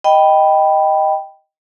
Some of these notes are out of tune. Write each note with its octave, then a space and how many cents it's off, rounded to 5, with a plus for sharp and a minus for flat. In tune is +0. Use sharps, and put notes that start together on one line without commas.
D#5 +0 G5 +0 B5 +0